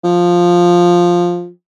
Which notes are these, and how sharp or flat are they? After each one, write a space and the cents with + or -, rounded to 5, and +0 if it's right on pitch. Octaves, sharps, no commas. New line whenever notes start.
F3 +5